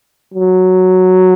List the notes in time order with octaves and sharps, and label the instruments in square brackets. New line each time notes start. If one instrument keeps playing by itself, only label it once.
[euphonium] F#3